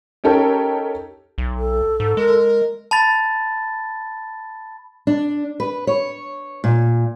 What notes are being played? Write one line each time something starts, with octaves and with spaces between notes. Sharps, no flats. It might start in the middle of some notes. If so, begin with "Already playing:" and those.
C#4 D#4 G4 A4 A#4 C#5
B1
A4
G#2
G#3 A#4
A5 B5 A6
D4
B4
C#5
A#2